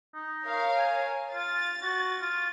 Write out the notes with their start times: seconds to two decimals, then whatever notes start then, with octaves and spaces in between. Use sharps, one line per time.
0.14 D#4
0.47 A#4 C#5 F5
0.76 G#5
1.34 F4 A6
1.83 F#4
2.21 F4